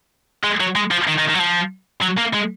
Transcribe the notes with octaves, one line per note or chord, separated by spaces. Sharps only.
G#3
F#3
G#3
F3
D#3
D#3
D#3
F#3
F3
F#3
A#3
G#3